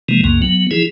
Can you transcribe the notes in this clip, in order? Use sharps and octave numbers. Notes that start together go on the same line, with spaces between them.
C3 E3 F3 G#3 A#3
C2 F#2 C#3 A#3
F#3 B3
E3 F3 E4 G#4